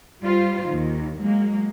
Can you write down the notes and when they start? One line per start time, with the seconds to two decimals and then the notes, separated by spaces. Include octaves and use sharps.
0.22 G3 F4 C5
0.69 D#2 D#3
1.20 F#3 G#3 A#3